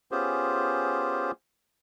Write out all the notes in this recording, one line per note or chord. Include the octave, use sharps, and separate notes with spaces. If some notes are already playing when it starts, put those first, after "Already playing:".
B3 C#4 F4 G4 G#4 C5